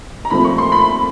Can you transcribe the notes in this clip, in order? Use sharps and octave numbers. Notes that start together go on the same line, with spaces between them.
A#5
A#2 F3 A3 C4 B5
C#6
C6
B5